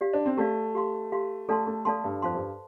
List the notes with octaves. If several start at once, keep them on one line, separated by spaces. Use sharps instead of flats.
G4 D5 F5
D4
C4
A3 G4 D5 F5
G4 F5 C6
G4 F5 C6
A3 A4 D5 F5 A5 C6
A3
A3 A4 D5 F5 A5 C6
G2
F2 C5 F5 A5 C6
G2